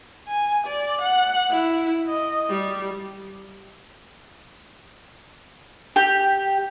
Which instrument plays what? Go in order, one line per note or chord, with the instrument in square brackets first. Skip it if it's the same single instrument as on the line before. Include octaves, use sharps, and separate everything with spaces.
[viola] G#5
D5
F#5
E4
D#5
G3
[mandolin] G4